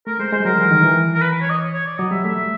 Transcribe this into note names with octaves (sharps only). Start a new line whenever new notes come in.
A3 A#4
G#3 C5
G#3 C5
G3
F#3 A#4
E3
D#3
E3
A#4
B4
C#5
D#5
C#5
D5
F#3 D#5
G3 E5
A3 E5